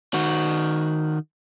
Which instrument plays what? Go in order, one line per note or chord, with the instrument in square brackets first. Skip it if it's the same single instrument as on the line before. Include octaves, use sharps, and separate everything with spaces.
[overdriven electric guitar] D#3 F#4